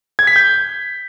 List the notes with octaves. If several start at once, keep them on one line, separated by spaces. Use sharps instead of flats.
G#6
B6
G6